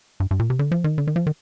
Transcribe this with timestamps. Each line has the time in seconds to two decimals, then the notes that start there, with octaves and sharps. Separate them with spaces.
0.20 G2
0.31 G2
0.39 A#2
0.50 C3
0.59 D3
0.72 F3
0.84 D#3
0.98 D3
1.07 D#3
1.16 F3
1.27 D#3